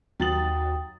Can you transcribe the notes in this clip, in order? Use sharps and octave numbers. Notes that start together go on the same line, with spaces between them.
D#2 F#3 G5 D#6 A6 F#7